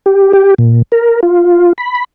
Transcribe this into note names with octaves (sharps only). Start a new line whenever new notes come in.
G4
G4
A#2
A#4
F4
B5